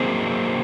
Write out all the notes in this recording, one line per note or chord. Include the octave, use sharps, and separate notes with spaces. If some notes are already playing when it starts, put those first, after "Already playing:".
Already playing: F#3 A#3 C4 D#4 G#4